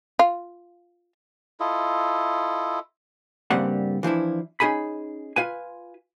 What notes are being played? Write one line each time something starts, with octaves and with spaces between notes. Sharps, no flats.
F4
E4 F4 A4 D#5
G2 C#3 G3 A#3 C4 F#5
E3 F3 D4 E4
C#4 D#4 G#4 G#5 B5
F4 B4 G#5